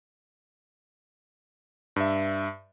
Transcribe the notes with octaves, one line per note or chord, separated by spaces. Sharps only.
G2 E5